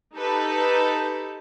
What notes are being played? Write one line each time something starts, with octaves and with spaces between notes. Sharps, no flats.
D#4 G4 A4 B4